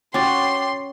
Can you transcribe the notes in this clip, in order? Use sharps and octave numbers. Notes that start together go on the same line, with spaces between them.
C#4 F#4 G5 C6 D6 A6